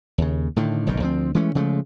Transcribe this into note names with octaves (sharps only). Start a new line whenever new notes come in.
D#2 C#3
A2 D3 D#3
F#1 B1 G#2 D#3
D2 F3 G#3 C4
E3 G#3 A3 C#4
C#3 F3 G#3 A3